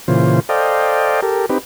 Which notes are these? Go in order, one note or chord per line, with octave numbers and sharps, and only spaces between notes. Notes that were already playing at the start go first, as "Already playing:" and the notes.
A#2 C#3 E3 F4 C5
A4 C5 D5 D#5 F5 G5
G4 A4 A#4
C4 D#4 G4 B4